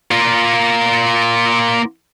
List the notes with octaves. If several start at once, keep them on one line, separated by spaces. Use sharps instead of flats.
A#3 F4